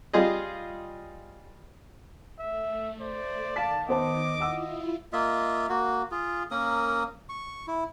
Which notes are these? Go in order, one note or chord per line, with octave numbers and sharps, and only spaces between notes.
G3 F4 G#4 D#5
A3 E5
C5 D5
D#3 F5 A5 B6
B3 C5 D#5 A5 D6
E4 F4 F#5 E6
A#3 F4 D#5 E5
A#3 F#4
F4 G#4
A#3 C#4 A#4 D#6
C#6
E4